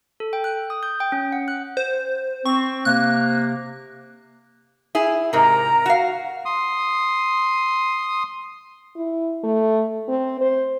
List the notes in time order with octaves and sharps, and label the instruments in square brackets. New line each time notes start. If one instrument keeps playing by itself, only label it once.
[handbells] A4
G5
F#6
D#6
G6
G5
C#4
F#5
F#6
[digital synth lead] C5
[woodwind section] C4 [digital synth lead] C#6
[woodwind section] C3 A#3 [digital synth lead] F#6
[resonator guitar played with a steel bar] E4 G#4
[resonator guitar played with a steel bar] G#2 C3 [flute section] A#4 A#5
[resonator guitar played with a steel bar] F#4 F5
[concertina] C6 D#6
[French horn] E4
A3
C4
C5